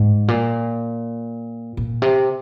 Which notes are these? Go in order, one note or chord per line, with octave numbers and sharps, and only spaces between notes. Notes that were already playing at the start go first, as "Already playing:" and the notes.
Already playing: G#2
A#2
A#2
C3